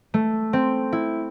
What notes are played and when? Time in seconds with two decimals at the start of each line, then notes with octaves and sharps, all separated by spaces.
0.14 A3
0.53 C4
0.92 E4